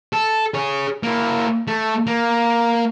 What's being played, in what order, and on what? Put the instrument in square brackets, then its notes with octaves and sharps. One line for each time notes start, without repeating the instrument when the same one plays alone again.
[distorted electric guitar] A4
G#4 C#5
A#3 E4
A3
A#3